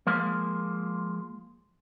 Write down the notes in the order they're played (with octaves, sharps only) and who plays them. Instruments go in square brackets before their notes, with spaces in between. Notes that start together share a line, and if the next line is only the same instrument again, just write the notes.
[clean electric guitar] F3 G#3 A#3